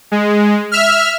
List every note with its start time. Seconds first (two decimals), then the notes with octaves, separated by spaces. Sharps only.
0.12 G#3
0.72 E5 F6